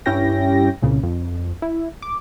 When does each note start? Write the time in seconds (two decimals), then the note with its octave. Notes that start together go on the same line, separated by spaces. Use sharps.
0.06 G2 C#4 E4 G4 G5 A#6
0.82 C2 A#2 C#3
1.03 F2
1.62 E4
2.02 D6